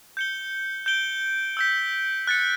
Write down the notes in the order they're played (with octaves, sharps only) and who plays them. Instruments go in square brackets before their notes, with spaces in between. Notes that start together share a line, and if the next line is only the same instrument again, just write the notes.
[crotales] G6 C#7 G7
G6 D7 G7
E6 G6 B6
F#6 A6 C#7